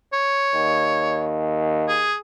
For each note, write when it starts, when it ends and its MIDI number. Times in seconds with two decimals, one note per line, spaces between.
0.13 1.31 73
0.55 2.13 39
1.88 2.16 68